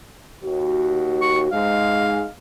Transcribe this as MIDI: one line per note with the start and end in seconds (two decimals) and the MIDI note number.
0.43 1.51 39
0.43 1.51 66
1.21 1.40 85
1.52 2.25 44
1.52 2.25 56
1.52 2.31 77